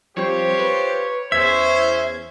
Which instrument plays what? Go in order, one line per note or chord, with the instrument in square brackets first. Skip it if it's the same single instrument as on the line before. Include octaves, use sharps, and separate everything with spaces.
[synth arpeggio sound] F3 G3 C4 [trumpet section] F4 G4 C5 [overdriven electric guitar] C#5
[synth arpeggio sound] B4
[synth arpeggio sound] E2 G#6 [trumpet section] C#4 C5 [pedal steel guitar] E5